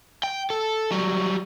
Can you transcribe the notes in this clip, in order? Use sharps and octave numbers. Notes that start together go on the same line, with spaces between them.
G5
A4
F#3 G3